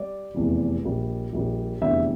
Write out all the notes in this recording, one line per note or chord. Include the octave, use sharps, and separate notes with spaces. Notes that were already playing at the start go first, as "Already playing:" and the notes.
Already playing: G3 D5
F1 E2 E3 G3
A#1 A#2 G3
A#1 A#2 G3
F1 E2 D3 G3 E5